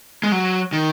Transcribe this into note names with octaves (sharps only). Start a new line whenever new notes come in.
G#3
F#3
D#3